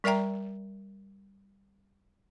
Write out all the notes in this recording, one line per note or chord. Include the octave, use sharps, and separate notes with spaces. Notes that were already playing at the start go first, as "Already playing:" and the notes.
G3 A#4 D5 E5 G5 A#5